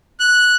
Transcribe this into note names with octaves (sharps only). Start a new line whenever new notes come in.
F#6